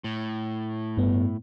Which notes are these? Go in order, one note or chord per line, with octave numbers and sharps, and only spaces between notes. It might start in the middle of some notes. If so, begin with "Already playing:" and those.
A2
G2 B3